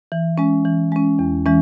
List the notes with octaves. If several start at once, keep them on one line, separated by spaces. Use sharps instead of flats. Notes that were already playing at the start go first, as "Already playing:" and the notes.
E3
G#3 C#4
E3
G#3 C#4
E2
E3 G#3 C#4